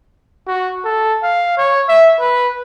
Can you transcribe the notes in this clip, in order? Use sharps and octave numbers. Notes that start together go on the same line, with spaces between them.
F#4
A4
F5
C#5
E5
B4